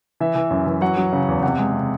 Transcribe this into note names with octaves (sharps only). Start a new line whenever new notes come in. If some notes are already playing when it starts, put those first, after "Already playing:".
E3 E5
E3
F#2
E3
F#3 F#5
F#3
C#3
E2
C3 F#5
G#3
C3